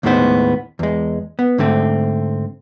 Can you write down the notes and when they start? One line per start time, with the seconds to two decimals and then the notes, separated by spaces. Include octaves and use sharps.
0.03 D#2 A2 D#3 G#3 B3 C5
0.79 E2 G#3
1.39 B3
1.58 G#2 D3 A3 C4